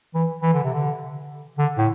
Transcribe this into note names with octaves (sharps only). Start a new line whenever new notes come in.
E3
E3
D3
C3
D3
D3
A2